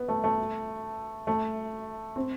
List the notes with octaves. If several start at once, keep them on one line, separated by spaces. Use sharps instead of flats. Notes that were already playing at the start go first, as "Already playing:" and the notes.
Already playing: B3
A3
A3
A3
C4